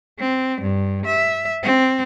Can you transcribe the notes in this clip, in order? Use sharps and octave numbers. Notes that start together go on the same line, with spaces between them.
C4
G2
E5
C4